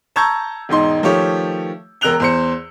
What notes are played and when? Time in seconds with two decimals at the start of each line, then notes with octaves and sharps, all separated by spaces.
0.16 A5 A#5 C#6 E6 G6 G#6
0.69 E1 G#2 D#4 C6
1.02 D#3 F3 A3 G4 C#5
2.01 E1 A#4 E6 F#6 F7 G7
2.20 E2 C5 C#7